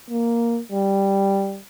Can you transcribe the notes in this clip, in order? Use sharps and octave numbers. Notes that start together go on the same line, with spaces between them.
A#3
G3